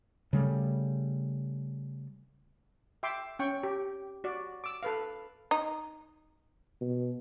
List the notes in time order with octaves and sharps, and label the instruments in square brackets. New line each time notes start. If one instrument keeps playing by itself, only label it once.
[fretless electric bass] C#3 G3 A3
[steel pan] E5 G5 C6 D6
C#4 G5 C#6
G4
F#4 D5
D6 E6
A4 B4 F5
[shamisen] D#4
[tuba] B2